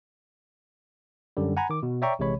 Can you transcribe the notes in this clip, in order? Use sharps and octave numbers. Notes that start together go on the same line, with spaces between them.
F#2 D3 G3
F#5 G#5 A#5 B5 G#6
D#3 D6
B2
C#5 D5 E5 G5 A#5 C#6
A#1 C3 E3 G#3 C#5 B5